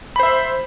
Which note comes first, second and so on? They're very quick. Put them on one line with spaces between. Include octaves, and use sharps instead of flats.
B5 C5 E5